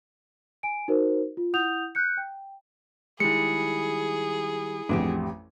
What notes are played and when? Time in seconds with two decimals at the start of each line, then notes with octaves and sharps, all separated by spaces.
0.63 G#5 D7
0.88 D#4 F#4 A#4 C5
1.37 F4
1.53 E4 F#5 D#6 G6 F7
1.95 F#6 G6 C#7
2.17 G5
3.20 D#3 G3 G#3 E4 G#4 C#7
4.89 A1 F2 D4 F#4 G4